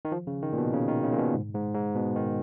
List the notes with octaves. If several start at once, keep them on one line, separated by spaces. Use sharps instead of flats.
D#3
F3
C#3
D#3
A#2
B2
C#3
D#3
C#3
A#2
B2
G#2
G#2
G#2
B2
D#3